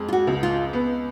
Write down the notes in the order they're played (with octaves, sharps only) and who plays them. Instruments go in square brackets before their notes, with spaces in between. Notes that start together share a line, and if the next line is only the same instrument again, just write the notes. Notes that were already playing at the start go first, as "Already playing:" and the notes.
Already playing: [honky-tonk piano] F2 G#3
[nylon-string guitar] F4
F#4
[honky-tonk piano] C#2
[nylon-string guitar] F4
[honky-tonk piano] B3